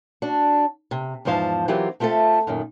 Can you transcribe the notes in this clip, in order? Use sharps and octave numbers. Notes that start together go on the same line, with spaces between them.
D4 F#4
C3
E2 G#2 F3 C5 F5 A5
E3 F#3 C4 F4 G4 A#4
A3 C4 F4 G4 A4 E5
F#2 A#2 D#3